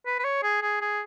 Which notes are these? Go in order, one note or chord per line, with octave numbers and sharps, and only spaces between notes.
B4
B4
C#5
G#4
G#4
G#4